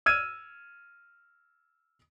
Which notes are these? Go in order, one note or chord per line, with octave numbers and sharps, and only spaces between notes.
E6 F6 G#6 D#7